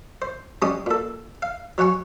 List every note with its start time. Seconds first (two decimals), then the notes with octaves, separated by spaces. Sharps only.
0.22 C5
0.62 G3 G#3 C#4 G4 D#6
0.86 A#2 A4
1.42 F5
1.78 F#3 C#5 F#5 G#5 C#6